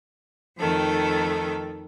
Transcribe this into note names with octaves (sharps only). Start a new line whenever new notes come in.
F2 D#3 A3 A4